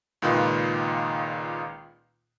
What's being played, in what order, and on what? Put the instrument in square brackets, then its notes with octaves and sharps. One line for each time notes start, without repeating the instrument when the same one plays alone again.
[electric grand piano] C#2 A#2 D#3 F4 B4